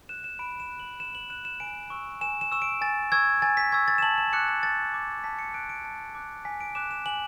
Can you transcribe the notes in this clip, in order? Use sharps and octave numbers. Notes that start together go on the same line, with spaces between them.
F#6 E7
E7
B5 D7
E7
F#6
F#7
B5 E7
F#7
F#6 E7
E7
G#5 D7
C#6 E6
G#5 E7
E7
C#6 E6 E7
D7
G#5 A6
C#6 E6 G#6
G#5 A6
B6
C#6 E6 G#6
A6
E7
A5 F#7
E7
D6 F#6 C#7
A6
A5 A6
D6 F#6
A5 B6
C#7
D6 F#6 D7
D7
A5 A6
D6 F#6
G#5 B6
D7
D6 F#6 E7
E7
G#5 F#7